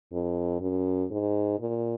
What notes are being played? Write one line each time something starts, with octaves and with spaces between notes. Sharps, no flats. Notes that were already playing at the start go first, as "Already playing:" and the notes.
F2
F#2
G#2
A#2